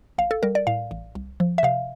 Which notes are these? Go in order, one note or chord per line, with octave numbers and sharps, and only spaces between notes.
A1 F5
A4
G3 A#4
D5
A2 F5
A1
C2
F3
E5
C3 F5